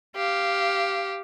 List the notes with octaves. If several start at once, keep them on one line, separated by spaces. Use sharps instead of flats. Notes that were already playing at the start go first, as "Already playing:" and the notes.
G4 F5